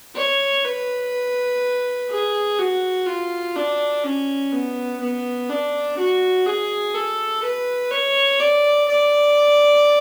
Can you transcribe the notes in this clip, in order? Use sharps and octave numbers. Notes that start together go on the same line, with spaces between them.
C#5
B4
G#4
F#4
F4
D4
C#4
B3
B3
D4
F#4
G#4
A4
B4
C#5
D5
D5